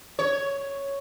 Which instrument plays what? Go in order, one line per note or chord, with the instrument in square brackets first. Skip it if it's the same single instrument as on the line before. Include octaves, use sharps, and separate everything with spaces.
[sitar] C#5